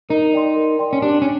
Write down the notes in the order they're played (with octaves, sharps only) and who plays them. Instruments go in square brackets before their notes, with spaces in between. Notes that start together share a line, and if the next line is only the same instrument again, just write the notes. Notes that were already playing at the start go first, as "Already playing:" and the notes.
[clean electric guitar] D#4 [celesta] A#4
[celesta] D5 G5 C6
A#4
D5 G5 C6
[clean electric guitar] C#4
[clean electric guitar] D4 [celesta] G4
[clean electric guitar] C#4